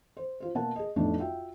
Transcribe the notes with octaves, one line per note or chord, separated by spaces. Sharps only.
C5
F4 C5
B2 A#3 A#4 F#5 A5
G#4 D#5
F2 A2 A3 B3 D4 D#4
F4 F#4 E5 G5